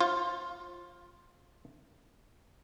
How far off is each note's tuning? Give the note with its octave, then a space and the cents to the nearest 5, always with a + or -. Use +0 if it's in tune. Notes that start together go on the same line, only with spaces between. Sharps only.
F4 +0 C5 +35